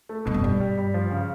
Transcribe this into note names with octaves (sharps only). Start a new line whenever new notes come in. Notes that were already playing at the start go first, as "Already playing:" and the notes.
A3
G2 B2
F#2
G2 G3
G3
G3
F3
C#3